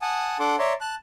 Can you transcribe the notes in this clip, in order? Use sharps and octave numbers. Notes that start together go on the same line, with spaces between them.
F#5 G#5 A5 D#6
D4 A4 F#5 C6 D6
C#5 D5 E5 A#5 C6
A5 F#6